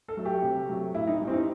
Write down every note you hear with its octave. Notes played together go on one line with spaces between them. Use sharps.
A4
F#3 A3
G4
C3
F#3 A3
A2 E4
D#4
E3 G3
C4
D#4